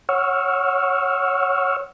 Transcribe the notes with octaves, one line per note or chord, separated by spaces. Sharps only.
C#5 F#5 C#6 E6 F6